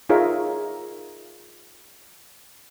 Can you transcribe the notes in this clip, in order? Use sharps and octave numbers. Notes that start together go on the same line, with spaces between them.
D#4 F4 G#4 A#4 C#5 E5